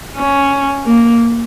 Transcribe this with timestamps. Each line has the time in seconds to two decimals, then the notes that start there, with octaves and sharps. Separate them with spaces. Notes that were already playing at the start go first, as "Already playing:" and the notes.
0.17 C#4
0.86 A#3